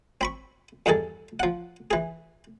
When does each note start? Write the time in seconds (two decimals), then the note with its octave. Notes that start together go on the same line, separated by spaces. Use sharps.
0.21 C4 B5 C#6
0.86 E2 G2 D#3 G#4 A4
1.40 F3 F#5
1.91 E3 G#4